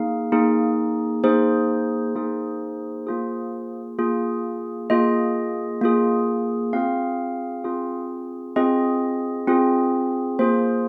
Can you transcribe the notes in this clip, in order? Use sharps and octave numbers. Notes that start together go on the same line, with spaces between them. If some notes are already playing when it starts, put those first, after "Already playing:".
Already playing: A#3 D#4 G#4 F5
A#3 D#4 G#4
A#3 D#4 G#4 C5
A#3 D#4 G#4
A#3 F4 G#4
A#3 F4 G#4
A#3 F4 G#4 D#5
A#3 F4 G#4
C4 F4 G#4 F5
C4 F4 G#4
C4 F4 G#4 D#5
C4 F4 G#4
A#3 F4 G#4 C5